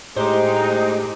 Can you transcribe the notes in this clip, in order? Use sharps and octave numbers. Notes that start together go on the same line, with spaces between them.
A2 G#3 D#4 G4 C5